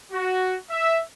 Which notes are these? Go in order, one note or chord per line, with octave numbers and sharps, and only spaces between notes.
F#4
E5